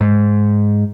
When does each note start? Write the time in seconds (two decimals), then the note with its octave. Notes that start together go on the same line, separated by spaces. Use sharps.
0.01 G#2